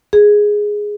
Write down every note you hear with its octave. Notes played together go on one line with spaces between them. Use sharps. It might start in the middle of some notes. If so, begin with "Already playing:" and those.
G#4